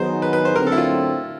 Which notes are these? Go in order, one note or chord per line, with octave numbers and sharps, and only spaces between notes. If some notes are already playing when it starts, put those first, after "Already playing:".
Already playing: D#3 F#3 B3 D#4 G#4 C5
B4
B4
C5
D3 F#3 A3 C4 A#4
A4
E4
F4